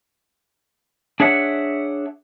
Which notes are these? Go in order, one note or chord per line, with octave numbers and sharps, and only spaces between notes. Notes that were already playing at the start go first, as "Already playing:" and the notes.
D4 G#4 C#5 E5 F#5